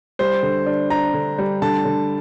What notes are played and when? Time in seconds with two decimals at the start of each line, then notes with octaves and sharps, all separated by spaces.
0.19 G3 C5
0.43 D3
0.66 D4
0.90 D4 A#5
1.14 D3
1.38 G3
1.62 D3 A5
1.85 D3